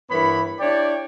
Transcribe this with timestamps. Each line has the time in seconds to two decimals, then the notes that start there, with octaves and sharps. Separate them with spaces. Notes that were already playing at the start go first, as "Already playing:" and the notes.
0.10 G2 E3 B3 A#4 C#5 B5
0.60 D4 E4 G4 C#5 D5